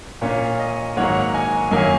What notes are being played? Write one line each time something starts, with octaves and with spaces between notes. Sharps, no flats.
A#2 A#3 C#4 C#5
D#5
G#2 D#3 F#3 A#3 C#5 F#5
D#5 G#5
F#2 D#3 F#3 A#3 C#4 D#5 G#5